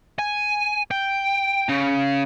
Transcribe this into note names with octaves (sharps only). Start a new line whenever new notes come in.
G#5
G5
C#3